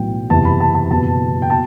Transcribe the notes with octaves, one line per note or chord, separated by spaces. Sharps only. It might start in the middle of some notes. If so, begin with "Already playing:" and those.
Already playing: B1 A2 E3 G5
F#1 E2 C3 E3 A5
B5
A5
A5
F#1 E2 B2 A5
G5
B2 A5